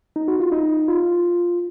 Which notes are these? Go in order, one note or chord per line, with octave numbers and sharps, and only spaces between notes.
D#4
F#4
F4
D#4
F4